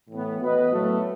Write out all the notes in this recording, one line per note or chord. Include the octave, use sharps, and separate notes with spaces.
A2 E3 B3
B3 F#4 B4 D#5
A2 F#3 A3